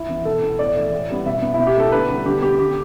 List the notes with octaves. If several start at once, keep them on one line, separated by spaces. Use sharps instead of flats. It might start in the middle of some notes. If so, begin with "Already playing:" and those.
Already playing: E4
E3 B3
B2 A4
B3
A2 D5
E3 A3
A2
G3 B3
B2 E5
B3
B2 E4
G4
A3 A4
D3 B4
G3 B3
D3 G4
B3 G4
D3 G4